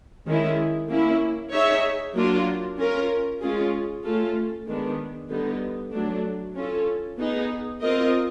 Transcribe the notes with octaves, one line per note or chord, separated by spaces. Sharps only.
D#3 G#3 C#4 E4
A#3 C#4 E4
D#4 G#4 C#5 E5
F#3 A#3 D4 F4 A#4
C#4 F4 A#4
G#3 C#4 F4 G#4
A3 C#4 F4 A4
D#3 G#3 B3 D4
D3 G3 B3 D#4
F#3 A3 D4
C#4 F4 A4
B3 D#4 G#4
C4 F4 A#4 D#5